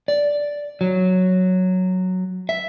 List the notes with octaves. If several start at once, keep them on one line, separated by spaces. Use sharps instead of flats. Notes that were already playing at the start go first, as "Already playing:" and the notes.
D5
F#3
E5